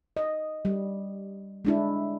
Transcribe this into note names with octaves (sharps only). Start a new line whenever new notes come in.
D#5
G3
G#3 D4 E4